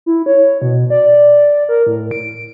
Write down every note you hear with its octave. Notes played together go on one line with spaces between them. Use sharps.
E4
C#5
B2
D5
A#4
A2
D7